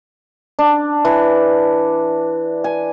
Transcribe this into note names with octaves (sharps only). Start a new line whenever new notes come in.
D4
E3
G#5